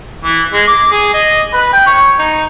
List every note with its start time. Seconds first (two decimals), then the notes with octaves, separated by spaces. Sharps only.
0.23 E3
0.53 G#3
0.67 D6
0.92 G#4
1.14 D#5
1.54 B4
1.73 G5
1.87 C#5
2.19 D#4